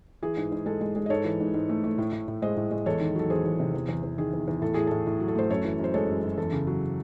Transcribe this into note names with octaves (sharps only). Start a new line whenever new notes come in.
E3 G#4
G#2
G#2
G#3 A4
G#3
G#3
D#5
G#2 A4 C#5
E3
G#2
G#2
A3
A3
A2
A2
A2
G#3 C5 D#5
A2
G#3
E2 A4 C#5
D#3
F#3 A4
E2 G#4 C5
E2
C3
E2
E2
E2
D#3 G#4
E2
E2
A2 A4
A2 G#4
A2 A4
A2
F#3
A4
A3 C5
F#2 A4 C#5
E3
F#2
C5
G#3 A4 C#5
F#2
F#2
E2 A4
C#3
F#3